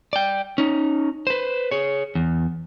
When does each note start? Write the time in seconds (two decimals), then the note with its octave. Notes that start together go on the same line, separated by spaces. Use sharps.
0.13 D5 G5
0.58 C#4 D#4
1.27 B4 C5
1.71 G#4 C#5
2.15 E2